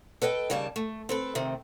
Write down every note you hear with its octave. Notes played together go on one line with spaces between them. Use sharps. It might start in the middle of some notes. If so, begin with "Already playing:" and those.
A4 B4 D#5 G5
D#2 C#3 G3 A#3 A5
A3
C4 A4 B4
C3 D#3 A3 C4